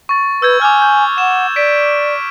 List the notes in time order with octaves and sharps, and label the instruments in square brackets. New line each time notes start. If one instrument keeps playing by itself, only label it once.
[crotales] C#6 A6
[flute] B4 [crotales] E6 G6 G#6
[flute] G#5 [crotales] D6 F6
[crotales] G6
[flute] F#5 [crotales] E7
[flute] D5 [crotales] B6 D7